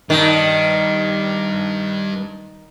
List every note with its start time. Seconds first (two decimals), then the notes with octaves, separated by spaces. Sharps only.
0.10 G2 D#3